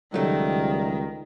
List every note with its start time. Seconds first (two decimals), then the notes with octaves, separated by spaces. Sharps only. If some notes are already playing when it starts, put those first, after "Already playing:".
0.14 C#2 D#3 F#3 G3 A3